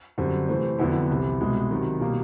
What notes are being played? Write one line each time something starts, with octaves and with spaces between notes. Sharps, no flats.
F#2 D3 G3 C4
C3 E3 A3 C4
F2 D3 F#3 B3 E4
C2 C3 E3
C2 B2 G#3
C3 D#3 F#3
B2 G3 A#3